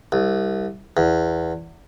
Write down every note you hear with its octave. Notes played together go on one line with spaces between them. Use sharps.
C2
E2